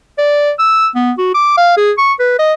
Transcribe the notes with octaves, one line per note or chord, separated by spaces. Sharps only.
D5
E6
B3
F#4
D6
F5
G#4
C#6
B4
D#5